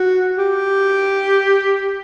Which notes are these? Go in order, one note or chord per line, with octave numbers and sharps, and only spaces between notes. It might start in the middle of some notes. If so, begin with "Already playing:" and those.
Already playing: F#4
G4